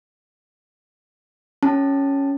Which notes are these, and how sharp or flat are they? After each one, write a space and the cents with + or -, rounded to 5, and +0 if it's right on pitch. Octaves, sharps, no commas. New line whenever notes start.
C#4 +0 G4 +0 A5 +0